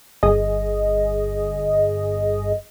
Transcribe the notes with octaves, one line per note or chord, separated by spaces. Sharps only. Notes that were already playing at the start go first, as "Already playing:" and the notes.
G1 G#4 D#5